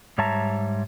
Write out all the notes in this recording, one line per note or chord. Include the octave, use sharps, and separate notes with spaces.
G#2 G3 C#5 E5 A5 A#5